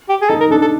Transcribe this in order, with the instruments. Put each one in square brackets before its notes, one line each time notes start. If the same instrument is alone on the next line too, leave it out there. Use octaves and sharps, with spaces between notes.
[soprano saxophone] G4
G#4
[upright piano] D#4 [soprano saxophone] A4
[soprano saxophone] A#4
[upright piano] D4 [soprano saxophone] A4
[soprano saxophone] A4